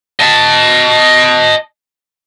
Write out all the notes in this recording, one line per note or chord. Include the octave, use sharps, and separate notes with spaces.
D#5 A5